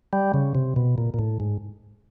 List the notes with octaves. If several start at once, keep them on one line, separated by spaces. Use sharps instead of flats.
G3
C#3
C3
B2
A#2
A#2
A2
G#2